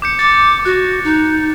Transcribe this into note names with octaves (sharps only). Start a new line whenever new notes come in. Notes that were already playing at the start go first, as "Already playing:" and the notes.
D6 G6 C#7
D6 A6
F#4 F#6
D#4